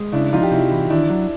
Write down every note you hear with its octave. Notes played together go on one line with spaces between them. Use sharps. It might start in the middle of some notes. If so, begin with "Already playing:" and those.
Already playing: G#3
C#3 D4 E4
F3 D#4 F4
G4
C3 E4 F#4
E3
D#3 D4 E4
F#3